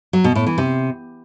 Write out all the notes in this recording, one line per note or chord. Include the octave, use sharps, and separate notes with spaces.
F#3
B2
A2
E3
C3